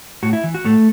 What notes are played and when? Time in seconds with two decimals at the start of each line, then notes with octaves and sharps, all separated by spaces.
0.23 A2 F#4
0.33 E4
0.44 E3
0.54 F#4
0.65 A2 A3